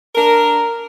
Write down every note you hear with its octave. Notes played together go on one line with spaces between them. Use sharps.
D4 A#4